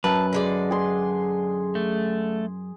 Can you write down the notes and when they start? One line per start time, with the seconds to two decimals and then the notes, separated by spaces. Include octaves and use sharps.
0.04 F#2 B4 A5
0.33 D3 G#3 D5
0.71 G#4 C6
1.75 A3